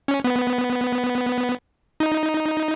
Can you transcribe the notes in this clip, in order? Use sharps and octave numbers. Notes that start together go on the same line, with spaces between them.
C#4
B3
D#4